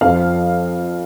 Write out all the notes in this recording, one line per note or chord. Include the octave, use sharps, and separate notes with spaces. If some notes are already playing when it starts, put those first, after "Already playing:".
F2 F3 F5